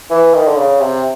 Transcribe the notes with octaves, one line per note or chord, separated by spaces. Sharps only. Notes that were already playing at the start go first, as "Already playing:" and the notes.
E3
D#3
D3
C#3
C3